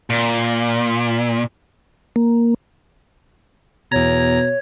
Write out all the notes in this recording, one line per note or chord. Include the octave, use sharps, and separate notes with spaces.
A#2
A#3
E2 B2 C#5 A#5